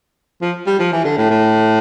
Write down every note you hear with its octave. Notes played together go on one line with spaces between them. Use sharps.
F3
G3
F3
E3
D3
A2
A2